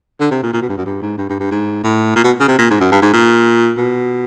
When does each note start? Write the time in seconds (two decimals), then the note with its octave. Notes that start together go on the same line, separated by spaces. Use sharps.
0.21 D3
0.31 C3
0.43 A#2
0.54 A#2
0.62 B2
0.69 G2
0.78 F#2
0.86 G2
1.02 G#2
1.18 G2
1.30 G2
1.40 G2
1.51 G#2
1.84 A2
2.16 A#2
2.24 B2
2.40 C#3
2.48 C3
2.59 A#2
2.71 G#2
2.81 F#2
2.92 G2
3.02 G#2
3.13 A#2
3.78 B2